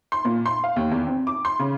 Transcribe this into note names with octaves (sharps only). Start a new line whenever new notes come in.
C6
A#2
C6
F5
D#2
E2
C4
D6
C6
C#3